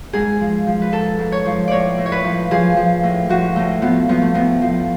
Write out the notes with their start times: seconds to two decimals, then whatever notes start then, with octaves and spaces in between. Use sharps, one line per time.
0.13 G#2 G#4
0.40 F3
0.67 F3
0.82 B4
0.92 G#2 A4
1.19 G#2
1.32 C#5
1.45 F3
1.68 A2 C#5 D5
1.98 A2
2.06 C#5
2.12 B4
2.24 F3
2.51 F3 G#4
2.77 F3
3.03 A2
3.29 F3 F#4
3.56 A2 A3
3.82 F3 B3
4.09 F3 B3
4.22 A3
4.34 A2 B3
4.61 F3